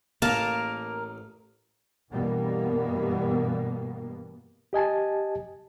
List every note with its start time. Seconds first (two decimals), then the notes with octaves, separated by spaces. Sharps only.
0.22 A1 A#3 A#4 F5 A5
2.11 G2 B2 E3 G3 A#3 B3
4.73 G4 D#5 G#5 A5